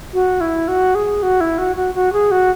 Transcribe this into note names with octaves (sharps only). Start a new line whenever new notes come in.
F#4
E4
F#4
G#4
F#4
E4
F#4
F#4
F#4
G#4
F#4